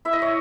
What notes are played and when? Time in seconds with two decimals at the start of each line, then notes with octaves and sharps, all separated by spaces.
0.05 E4 E5
0.13 D#5
0.22 C#5